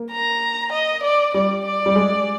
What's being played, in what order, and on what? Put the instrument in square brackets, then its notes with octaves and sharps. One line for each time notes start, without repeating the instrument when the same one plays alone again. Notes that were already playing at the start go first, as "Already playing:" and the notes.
Already playing: [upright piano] A#3
[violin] A#5
D#5
D5
[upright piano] G3 [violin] D5
[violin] D5
[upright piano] G3
G#3